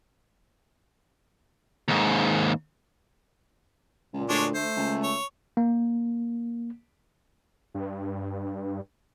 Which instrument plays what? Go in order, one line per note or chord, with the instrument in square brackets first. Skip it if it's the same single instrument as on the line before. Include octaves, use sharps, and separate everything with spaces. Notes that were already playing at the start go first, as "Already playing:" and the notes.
[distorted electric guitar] D#2 G#2
[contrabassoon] C#2 [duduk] A#2
[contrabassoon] D2 [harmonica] G#3 D4 C#5
[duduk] A3 [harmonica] C5
[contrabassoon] C#2
[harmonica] C#5
[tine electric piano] A#3
[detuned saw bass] G2